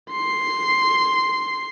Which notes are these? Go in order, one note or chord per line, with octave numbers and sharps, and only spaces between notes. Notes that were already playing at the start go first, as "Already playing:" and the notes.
C6 C7